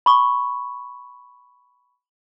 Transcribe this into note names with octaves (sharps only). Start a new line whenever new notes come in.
B5 C#6